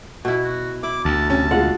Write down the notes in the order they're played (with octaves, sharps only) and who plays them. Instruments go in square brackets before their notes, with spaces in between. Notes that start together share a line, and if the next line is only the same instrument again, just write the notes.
[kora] B2 E4
[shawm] F#4
[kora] E4 [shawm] D6
[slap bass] D2 [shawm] A5
[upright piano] C3 C#4 [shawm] A5
[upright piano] B2 G#3 F4 [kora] F#5